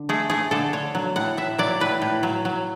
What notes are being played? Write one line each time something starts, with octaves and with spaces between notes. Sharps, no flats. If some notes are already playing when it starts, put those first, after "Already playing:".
Already playing: D3
A3 G#4
A3 G#4
D3 A4
D3 C#5
F#3
A2 F#5
A2 E5
F#3 D5
A2 B4
A2
F#3
F#3